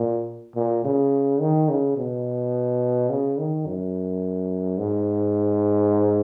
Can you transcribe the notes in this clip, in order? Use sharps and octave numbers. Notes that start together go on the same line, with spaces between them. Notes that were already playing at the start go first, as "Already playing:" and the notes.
Already playing: A#2
A#2
C#3
D#3
C#3
B2
C#3
D#3
F#2
G#2